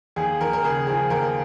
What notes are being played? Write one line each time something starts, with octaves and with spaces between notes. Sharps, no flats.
D#2 G#4
D#2 A#4
A#4
C#3 G#4
F3 G#4
D#2 A#4